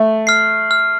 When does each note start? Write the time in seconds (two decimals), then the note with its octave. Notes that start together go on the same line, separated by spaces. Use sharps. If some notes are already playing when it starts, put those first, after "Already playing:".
Already playing: A3
0.27 F6 C7
0.71 F6